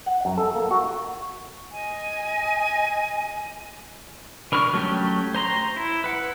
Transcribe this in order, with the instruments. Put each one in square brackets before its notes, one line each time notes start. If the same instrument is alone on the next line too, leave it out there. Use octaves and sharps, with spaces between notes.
[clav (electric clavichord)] F#5
F#2
A4
A#3
F#4
[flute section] D#5 G#5
[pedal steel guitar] D3 A#4 B5 C#6 F6
F#3 A3 C#4 G4
C5 A#5 C6
E4
B4 F#5